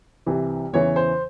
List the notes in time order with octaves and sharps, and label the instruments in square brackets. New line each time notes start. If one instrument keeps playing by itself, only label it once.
[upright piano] C2 C3 E3
E2 C#3 E3 C#5
C5